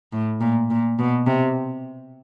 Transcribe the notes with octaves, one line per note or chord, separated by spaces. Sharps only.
A2
A#2
A#2
B2
C3